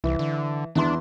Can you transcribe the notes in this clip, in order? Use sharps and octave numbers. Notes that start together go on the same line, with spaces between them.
C2 E3
D3
E2 E3 D4 C6